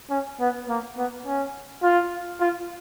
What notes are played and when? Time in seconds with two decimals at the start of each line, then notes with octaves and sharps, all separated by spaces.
0.10 C#4
0.40 B3
0.69 A#3
0.97 B3
1.26 C#4
1.83 F4
2.40 F4